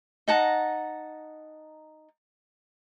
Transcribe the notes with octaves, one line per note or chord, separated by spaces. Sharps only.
D#4 F#5 A5 A#5